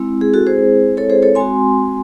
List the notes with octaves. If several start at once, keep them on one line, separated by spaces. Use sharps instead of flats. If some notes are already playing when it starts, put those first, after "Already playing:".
Already playing: G#3 C4 E4
G#4
F#4 A4
G#4 C5
A4 C#5
G#4 C5
A4 C#5
G#3 C4 F#4 G#5 C6